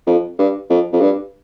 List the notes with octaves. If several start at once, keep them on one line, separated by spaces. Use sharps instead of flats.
F2
G2
F2
F2
G2